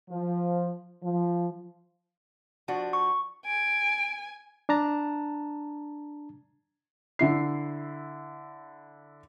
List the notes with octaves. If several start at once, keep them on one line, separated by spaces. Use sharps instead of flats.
F3
F3
F3 D4 F#4
C#6
G#5 D7
D4 A5 A#5
D3 E4 C7